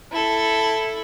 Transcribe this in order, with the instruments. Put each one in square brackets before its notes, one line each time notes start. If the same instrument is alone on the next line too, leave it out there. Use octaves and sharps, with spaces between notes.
[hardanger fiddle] E4 A4